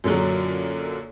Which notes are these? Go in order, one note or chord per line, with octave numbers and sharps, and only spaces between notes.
F#2 A#2 D3 F#3